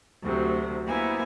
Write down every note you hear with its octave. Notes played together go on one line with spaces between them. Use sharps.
D2 C3 F#3
A#3 B3 E4 C5 G#5